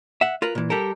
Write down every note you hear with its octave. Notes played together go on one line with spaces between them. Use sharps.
E5 F#5
F4 A#4 B4
A#2 E3
G3 G4 A4 A#4